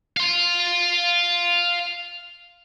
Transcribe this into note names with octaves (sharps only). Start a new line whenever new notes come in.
F5 C6